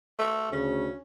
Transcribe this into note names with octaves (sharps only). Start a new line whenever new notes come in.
A3
D2 C#3 C#4